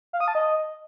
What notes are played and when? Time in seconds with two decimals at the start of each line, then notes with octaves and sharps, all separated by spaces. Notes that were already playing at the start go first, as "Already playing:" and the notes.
0.13 F5
0.20 D#6
0.28 A5
0.35 D#5